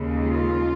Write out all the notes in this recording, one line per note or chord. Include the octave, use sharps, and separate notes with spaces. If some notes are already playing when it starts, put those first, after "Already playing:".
Already playing: D#2 C#3 G#3
F4